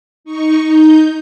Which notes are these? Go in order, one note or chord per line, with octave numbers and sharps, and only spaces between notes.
D#4 C#6
D#4 G6